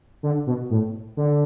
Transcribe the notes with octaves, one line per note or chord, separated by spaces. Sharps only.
D3
B2
A2
D3